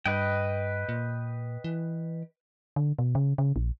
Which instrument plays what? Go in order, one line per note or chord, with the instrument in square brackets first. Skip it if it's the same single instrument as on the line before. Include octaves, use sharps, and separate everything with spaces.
[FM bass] G2 [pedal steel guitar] B4 D#5 G5
[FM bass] A#2
E3
D3
B2
C#3
C#3
A#1